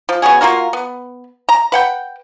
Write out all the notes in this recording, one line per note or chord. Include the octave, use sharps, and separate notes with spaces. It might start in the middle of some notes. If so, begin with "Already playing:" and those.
F3
B3 C#4 F#4 G#4
A#3 F4 F#4 A#4
B3
A#5
B4 F#5 G5